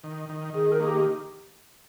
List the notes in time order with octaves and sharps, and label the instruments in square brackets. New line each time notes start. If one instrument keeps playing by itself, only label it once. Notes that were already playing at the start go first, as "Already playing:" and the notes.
[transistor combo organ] D#3
D#3
[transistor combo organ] D#3 [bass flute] G#4
[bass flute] A#4
[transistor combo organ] A#3 [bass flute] G#4
[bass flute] G4